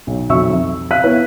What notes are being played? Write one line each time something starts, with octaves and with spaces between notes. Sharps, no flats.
B1
B1 F2 F#3 E5 C#6 E6
F2
E5 F5 F#6 B6 D#7
B3 E4 B4 C#5